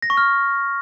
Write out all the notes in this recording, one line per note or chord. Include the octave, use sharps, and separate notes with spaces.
A#6
C#6
F6